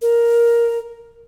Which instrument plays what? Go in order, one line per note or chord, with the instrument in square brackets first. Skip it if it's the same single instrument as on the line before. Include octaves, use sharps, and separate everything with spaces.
[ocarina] A#4